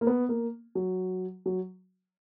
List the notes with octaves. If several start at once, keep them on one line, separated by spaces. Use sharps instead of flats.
A#3
B3
A#3
F#3
F#3